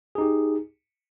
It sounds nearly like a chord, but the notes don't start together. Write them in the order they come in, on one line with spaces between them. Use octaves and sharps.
G#4 D#4 G4